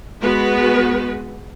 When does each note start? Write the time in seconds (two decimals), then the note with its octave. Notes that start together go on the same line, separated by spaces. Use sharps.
0.20 G#3 B3 F#4 B4